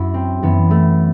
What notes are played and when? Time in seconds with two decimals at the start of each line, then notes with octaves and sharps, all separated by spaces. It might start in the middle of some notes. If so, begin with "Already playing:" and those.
Already playing: F#2 E4 F#4
0.14 C4
0.42 F#2 E3 B3
0.71 A3